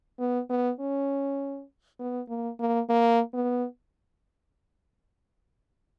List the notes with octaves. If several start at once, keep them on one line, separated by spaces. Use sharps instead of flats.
B3
B3
C#4
B3
A#3
A#3
A#3
B3